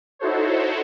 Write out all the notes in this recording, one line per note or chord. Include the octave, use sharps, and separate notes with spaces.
D#4 E4 F#4 A4 C5 C#5